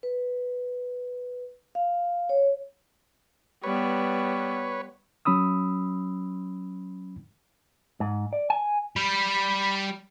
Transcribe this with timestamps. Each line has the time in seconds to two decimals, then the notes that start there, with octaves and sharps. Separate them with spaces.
0.03 B4
1.75 F5
2.29 C#5
3.64 G3 B3 B4 C#5
5.25 F#3 C#4 B5 D#6 E6
8.00 G#2
8.33 D5
8.50 G#5
8.96 G3 B5